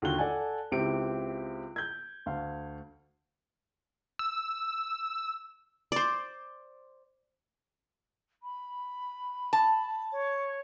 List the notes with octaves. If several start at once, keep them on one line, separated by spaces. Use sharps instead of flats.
D#2 D3 F4 F#4 F#6 G7
A4 D5 F#5 G#5 A5
C#2 C4 E4 G4 D7
G6 G#6
D2 F5
E6
C5 D5
B5
A5
C#5